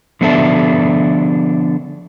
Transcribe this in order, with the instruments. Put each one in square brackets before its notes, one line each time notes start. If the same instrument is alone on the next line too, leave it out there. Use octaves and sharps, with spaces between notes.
[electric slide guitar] D3 F3 B3 D4 A4 E5